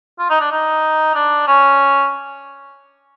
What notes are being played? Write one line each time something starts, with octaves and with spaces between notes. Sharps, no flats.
F4
D#4
D4
D#4
D4
C#4